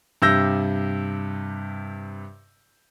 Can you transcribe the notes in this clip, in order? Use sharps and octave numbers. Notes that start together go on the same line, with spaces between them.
G2 C3 E6 G6 A#6